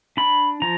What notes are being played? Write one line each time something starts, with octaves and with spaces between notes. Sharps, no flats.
D4 B5
F3 A#5